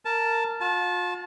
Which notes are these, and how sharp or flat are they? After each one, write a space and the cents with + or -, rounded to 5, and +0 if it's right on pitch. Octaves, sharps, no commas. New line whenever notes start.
A#4 -15 A5 +0
F4 +40 A5 -20